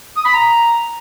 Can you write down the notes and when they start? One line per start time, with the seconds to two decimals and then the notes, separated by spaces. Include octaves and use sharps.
0.16 D#6
0.25 B5
0.34 A#5